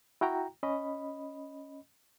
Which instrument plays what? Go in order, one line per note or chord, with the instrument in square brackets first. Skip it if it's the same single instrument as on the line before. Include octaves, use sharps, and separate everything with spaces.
[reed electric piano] E4 F#4 G5 A#5
C#4 D#5 B5